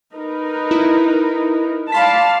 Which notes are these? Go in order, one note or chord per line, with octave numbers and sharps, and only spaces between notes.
D#4 A#4 B4
E4
D5 F5 A5 B5 C6 B6